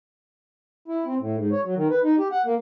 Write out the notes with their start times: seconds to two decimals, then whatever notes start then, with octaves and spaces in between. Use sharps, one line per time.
0.88 E4
1.06 C4
1.19 A2
1.36 G#2
1.52 C#5
1.64 F#3
1.77 D#3
1.90 B4
2.04 D#4
2.19 G4
2.32 F#5
2.46 A#3